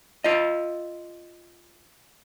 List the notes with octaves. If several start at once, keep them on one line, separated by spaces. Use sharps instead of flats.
F4 D#5